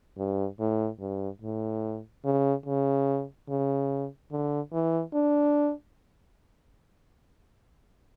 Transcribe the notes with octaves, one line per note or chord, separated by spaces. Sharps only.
G2
A2
G2
A2
C#3
C#3
C#3
D3
E3
D4